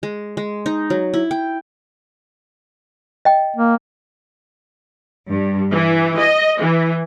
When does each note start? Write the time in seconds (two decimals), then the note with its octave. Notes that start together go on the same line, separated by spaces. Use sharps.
0.03 G#3
0.37 G#3
0.66 D#4
0.90 F#3
1.14 E4
1.31 G5
3.25 D#5 G5
3.56 A#3
5.31 G2
5.71 E3
6.17 D#5
6.59 E3